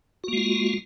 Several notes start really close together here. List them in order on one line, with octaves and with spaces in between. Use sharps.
F#4 A#3 G#3 F4